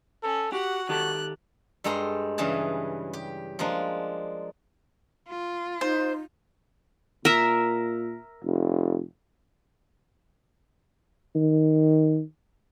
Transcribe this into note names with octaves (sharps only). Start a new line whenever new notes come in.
C#4 A4
F#4 G4 F#5
D#3 G4 A4 F#6
G2 G#3 A4 G5 A#5 C6
G2 C#3 E3 G#4 A5
G4
F3 G#3 A#3 D4
F4
D#4 C5
A#2 A#4 E5
F1
D#3